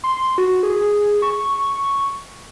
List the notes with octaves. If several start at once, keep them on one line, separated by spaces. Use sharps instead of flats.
C6
F#4
G#4
C#6